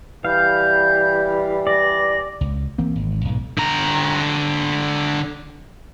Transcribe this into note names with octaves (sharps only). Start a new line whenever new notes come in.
E3 G3 F5 G6
D5 A#6
C#2
E3 A#3 C4
G#1
B1 G#2
D3 A#5